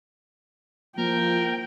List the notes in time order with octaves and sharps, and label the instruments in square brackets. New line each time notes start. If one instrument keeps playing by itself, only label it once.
[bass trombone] F3 [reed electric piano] A#3 [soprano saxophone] A#4 [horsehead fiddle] G5